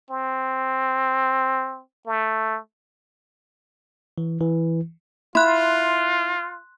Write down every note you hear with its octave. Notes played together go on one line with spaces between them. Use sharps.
C4
A3
E3
E3
E4 F4 C6 F#6